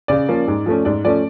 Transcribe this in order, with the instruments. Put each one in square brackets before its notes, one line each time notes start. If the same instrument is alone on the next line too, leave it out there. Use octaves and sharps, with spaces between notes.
[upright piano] C#3 D5
F3 A#3 C#4
G#2
F3 A3 C#4
G#2 D5
F3 A3 C#4 D5